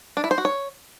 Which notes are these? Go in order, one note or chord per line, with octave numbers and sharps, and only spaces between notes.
D4
E4
C5
F#4
C#5